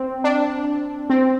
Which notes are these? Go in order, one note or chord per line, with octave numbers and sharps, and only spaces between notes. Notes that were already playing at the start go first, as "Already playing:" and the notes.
Already playing: C4
D4
C4